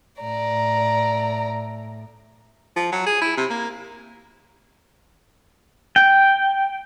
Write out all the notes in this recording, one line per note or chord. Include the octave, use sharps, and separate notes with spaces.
A2 D5 A#5
F3
F#3
G#4
E4
C3
A#3
G5